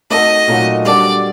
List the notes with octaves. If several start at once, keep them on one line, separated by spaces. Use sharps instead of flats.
A3 D#4 F#4 A4 D#5
A#2 F#3 A3 D#4 F#4
G3 D4 F#4 A4 D5